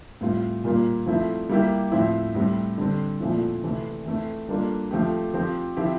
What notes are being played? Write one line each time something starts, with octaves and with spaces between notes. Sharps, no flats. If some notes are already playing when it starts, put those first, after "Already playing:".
A2 G3 C4 F4
A#2 G3 A#3 F4
F3 A3 C4 E4
G3 A#3 E4 G4
A2 F3 C4 E4
A2 G3 C4
D3 G3 C4
A#2 F3 A3 C4 E4
C3 E3 A3 C4
E3 A3 C4
G3 A#3 D4 F4 A4
F3 A3 C4 G4
F3 C4 G4
F3 C4 E4 G4